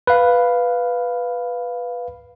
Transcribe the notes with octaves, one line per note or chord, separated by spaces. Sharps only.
B4 F5